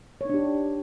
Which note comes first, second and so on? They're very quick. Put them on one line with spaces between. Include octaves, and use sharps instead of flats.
C#5 D#4 D4 G4